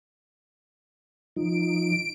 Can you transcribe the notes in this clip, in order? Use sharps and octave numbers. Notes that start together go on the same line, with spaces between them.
F3 D#4 D7